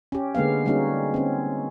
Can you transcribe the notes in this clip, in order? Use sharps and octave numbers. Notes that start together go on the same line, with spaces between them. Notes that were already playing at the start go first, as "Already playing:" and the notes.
C#4 G4
D3 G#3 A#3 B3 F5
G3 G#3 A#3 C#4 D#4 F#4
C4 C#4